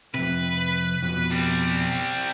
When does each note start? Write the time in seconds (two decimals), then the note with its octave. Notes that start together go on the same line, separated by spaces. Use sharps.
0.14 F2 C3 B4
1.03 F2 B2
1.32 G3 C4